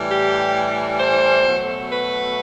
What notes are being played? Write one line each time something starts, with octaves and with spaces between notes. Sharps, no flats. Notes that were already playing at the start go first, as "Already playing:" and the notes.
Already playing: A2 E3 G3
G4
C5
B2 F#3 A3
B4